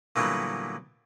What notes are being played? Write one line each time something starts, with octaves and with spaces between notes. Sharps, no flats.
A#2 D3 E3 F#3 G3 B3